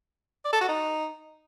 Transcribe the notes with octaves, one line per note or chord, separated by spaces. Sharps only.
D5
A4
F#4
D#4